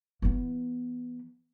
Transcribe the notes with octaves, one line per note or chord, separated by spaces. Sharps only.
E3 B3